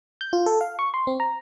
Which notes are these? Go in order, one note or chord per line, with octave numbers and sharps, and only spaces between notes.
G6
F4
A4
F5
C#6
C6
C4
A#5